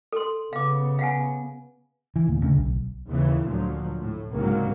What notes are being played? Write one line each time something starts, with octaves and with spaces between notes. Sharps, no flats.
A4 C6
C#3 B3 F5 D6
F5 F#5 G#5
E3
D2 A#2
D2 C#3
B1
D#2 C#3 E3
D2 A#2 F3 F#3
A2
C2 G#2 C#3 F#3 A#3